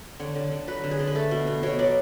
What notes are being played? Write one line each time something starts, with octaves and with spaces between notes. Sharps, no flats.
D3 C#5
D3
D3
F#3 B4
D3
G#4
D3
B4
A3 A4
B2
B2
B2 C#5
F#3 D5